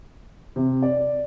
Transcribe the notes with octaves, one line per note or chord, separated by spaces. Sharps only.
C3
D5